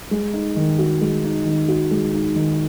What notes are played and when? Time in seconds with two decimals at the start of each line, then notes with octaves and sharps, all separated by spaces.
0.11 G#3
0.33 D#4
0.56 D#3
0.79 F#4
1.01 G#3
1.24 D#4
1.46 D#3
1.68 F#4
1.91 G#3
2.14 D#4
2.36 D#3